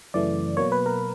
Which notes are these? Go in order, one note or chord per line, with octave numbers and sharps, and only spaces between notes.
F#2 C#3 E3 A3 D5
B2 F#3 A#3 C#5
B4
A#4